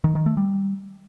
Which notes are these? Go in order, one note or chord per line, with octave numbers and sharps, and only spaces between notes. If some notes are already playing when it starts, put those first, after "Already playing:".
D#3
D#3
A3
G3